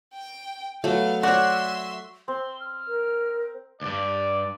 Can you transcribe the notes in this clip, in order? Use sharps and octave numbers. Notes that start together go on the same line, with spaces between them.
G5
F#3 A3 B3 F5
F#4 C#5 D5 E5 C6
C4 C6
F6
A#4
D2 G2 D5